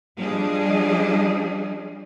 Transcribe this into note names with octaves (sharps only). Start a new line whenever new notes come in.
F3 G3 D4 G#4 D#5